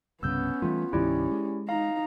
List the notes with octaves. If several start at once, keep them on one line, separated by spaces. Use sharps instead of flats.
C2 G2 C#3 B3 C#4 E6 G6
E3 G3 A3 F4
C2 G2 D#3 C#4 E4 G4 D5
G#3
D#4 F5 A#5